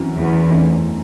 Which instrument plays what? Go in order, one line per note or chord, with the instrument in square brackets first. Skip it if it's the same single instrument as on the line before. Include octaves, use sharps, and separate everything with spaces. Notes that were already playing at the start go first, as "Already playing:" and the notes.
Already playing: [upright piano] F#2 E3 C4 F#4
[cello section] E2
[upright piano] F#2 E3 A3 C4 D#4